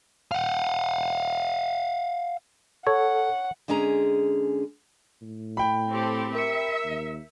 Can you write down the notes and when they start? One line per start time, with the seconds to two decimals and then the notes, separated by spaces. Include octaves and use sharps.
0.32 F5 F#5
2.87 A4 C#5 F#5
3.68 D3 G#3 C#4 G#4 A#5
5.22 A2
5.57 G5 B5
5.90 C4 G4 A4
6.35 A#4 E5 C#7
6.85 D#2